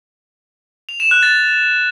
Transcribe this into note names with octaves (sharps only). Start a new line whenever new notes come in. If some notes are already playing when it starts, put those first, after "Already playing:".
F7
E7
F#6
A6